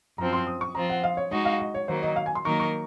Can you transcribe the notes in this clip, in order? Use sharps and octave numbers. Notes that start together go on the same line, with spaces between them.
F#2 F3 C4 A#5
C6
D#6
C#6
F3 C4 F4 A#5
F#5
F5
C#5
G#3 D#4 F#4 D#5
F5
D#5
C#5
D#3 F#3 A#3 C5
D#5
F5
G#5
C6
D#3 F#3 A#3 D#4 A#4 C#6
C#6